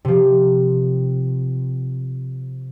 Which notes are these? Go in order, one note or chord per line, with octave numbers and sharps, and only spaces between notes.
C3 F3